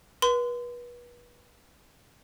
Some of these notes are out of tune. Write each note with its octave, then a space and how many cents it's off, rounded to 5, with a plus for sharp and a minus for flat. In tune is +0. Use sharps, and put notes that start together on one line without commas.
B4 -35 C6 -30